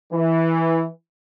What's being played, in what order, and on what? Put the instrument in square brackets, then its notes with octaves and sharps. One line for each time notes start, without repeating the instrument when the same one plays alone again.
[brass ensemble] E3